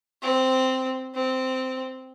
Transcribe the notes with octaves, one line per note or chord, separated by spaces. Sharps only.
C4
C4